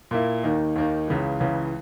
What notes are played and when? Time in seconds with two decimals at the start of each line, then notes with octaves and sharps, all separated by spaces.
0.11 A#2 A#3 E4
0.44 D#2 D#3 A#3 D#4
0.76 D#2 D#3 A#3 D#4
1.08 C#2 C#3 E3
1.40 C#2 C#3 E3